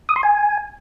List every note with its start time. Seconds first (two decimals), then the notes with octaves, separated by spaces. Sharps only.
0.09 D#6
0.16 C6
0.23 G#5